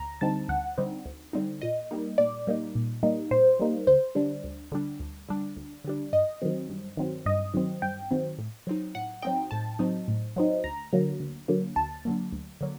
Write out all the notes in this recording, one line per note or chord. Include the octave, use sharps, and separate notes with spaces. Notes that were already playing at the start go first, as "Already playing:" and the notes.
Already playing: D2 A#5
D3 G3 C4 D#4 A5
D2 F#5
D3 G3 C4 D#4
D2
D3 G3 C4 D#4
A#2 D#5
G3 A#3 D#4
A#2 D5
G3 A#3 D#4
A#2
G3 A#3 D#4
A#2 C5
G3 A#3 D#4
D2 C5
D3 G3 D4
D2
D3 G3 D4
D2
D3 G3 D4
D2
D3 G3 D4
G2 D#5
D#3 F#3 C4
G2
D#3 F#3 C4
G2 D#5
D#3 F#3 C4
G2 G5
D#3 F#3 C4
A2
F#3 C4 D#4
A2 F#5
F#3 C4 D#4 G5
A2 A5
F#3 C4 D#4
A2
F#3 C4 D#4
D2 A#5
D3 F#3 A#3
D2
D3 F#3 A#3
D2 A5
D3 F#3 A#3
D2
D3 F#3 A#3